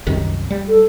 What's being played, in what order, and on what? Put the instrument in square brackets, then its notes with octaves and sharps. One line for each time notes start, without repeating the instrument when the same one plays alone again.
[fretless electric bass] C2 F#2 D#3
G3
[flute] A4